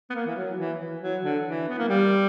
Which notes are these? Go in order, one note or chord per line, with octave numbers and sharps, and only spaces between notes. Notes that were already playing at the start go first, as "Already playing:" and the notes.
B3
A#3
E3
F#3
E3
E3
F#3
D3
E3
B3
A#3
G3